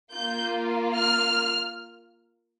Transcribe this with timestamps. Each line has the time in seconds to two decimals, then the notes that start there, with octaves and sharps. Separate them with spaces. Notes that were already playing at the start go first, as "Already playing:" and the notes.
0.14 A#3 F4 G6
0.97 F6